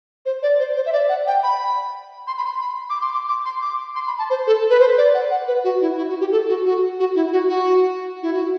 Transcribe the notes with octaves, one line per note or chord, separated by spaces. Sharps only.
C5
D5
C5
C5
E5
D5
F#5
G5
B5
C6
B5
C6
B5
D6
C6
D6
D6
C6
D6
C6
B5
A5
C5
A4
B4
C5
D5
F#5
F#5
B4
F#4
E4
E4
F#4
G4
A4
F#4
F#4
F#4
E4
F#4
F#4
E4
F#4